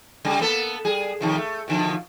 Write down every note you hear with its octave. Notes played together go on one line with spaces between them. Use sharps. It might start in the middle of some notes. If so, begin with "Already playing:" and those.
C#3 G3
A#3 B3 A4
G3 G#4
C3 D#3 F3
A3
B2 D3 F3